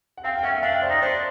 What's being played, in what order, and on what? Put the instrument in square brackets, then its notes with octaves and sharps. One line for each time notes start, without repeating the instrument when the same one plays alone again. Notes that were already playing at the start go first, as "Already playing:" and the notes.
[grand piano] F#5
[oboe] C4 [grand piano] F5 G5
[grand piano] G5
[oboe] C#4 [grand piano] E5 F#5
[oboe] D4 [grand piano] F5 G5
[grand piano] C5 D5
[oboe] D#4
[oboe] D4 [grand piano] C5 D5